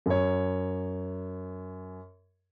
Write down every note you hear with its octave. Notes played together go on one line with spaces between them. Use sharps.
F#2 C#5